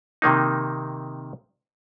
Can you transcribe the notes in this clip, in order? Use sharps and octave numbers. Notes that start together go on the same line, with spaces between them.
C3 D#3 A#3 D#4